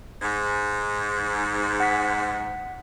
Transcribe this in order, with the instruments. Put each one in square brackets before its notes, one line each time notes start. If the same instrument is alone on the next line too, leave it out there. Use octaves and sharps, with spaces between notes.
[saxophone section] G#2
[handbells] F#5 B6